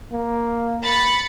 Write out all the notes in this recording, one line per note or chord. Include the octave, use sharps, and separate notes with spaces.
A#3
B5 A6 C#7